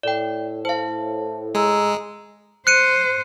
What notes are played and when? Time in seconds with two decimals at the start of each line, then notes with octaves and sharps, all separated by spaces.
0.03 A2 D5 G5
0.65 C5 F5 A5
1.55 G#3 G#4 A#5 E6
2.67 C5 F#6 C#7 D#7